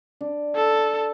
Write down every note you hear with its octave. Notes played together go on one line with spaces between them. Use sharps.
D4
A4